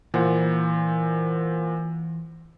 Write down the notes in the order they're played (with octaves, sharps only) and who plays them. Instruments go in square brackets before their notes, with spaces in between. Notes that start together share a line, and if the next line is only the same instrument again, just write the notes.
[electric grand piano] A#2 C5 F#5 [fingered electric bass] E3